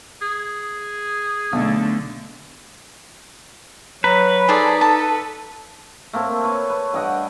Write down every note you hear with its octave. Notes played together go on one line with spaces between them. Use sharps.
G#4
B1 D3 A3
F#3 B4 A#5
D#4 G#4 A4 C5 D5
A4 A5
A3 A#3 C4 A4
B4 C#5
B4
G2 G4 D#5 F#5